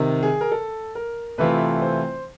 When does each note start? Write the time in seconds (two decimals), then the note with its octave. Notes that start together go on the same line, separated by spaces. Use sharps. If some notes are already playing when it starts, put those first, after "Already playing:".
Already playing: C3 D#3
0.23 G#4
0.41 A#4
0.52 A4
0.95 A#4
1.38 C3 E3 A3 C4 F4 B4
1.82 C5